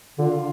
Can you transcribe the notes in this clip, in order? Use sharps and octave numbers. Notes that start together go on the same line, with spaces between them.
D3 F4